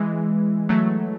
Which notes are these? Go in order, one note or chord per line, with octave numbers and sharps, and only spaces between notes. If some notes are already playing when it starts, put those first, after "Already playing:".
Already playing: E3 G#3
F#3 A3